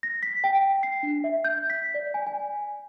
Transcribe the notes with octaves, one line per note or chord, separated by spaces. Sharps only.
A#6
B6
G5
C7
D4
E5
G6
B6
D5
G#5
G#5